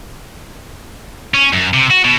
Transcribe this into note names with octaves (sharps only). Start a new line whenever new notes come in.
C#4
F#2
C3
F#4
B2